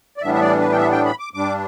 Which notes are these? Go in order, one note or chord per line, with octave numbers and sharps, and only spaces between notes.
D5
A2 E3 G3 B3 D4 E5
E5
D5
B4
G5
E5
G5
B5
D6
G2 G3 D4 D6